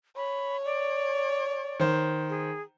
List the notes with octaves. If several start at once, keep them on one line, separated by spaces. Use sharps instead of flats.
C#5 B5
D5
D#3 C5
G#4